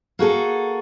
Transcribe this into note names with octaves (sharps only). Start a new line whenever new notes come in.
A#3 F#4 G#4 A4